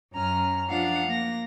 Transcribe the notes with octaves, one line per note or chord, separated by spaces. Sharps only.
F#2 C#4 A#5 F6
F3 D4 F5 F#5
A#3 A#6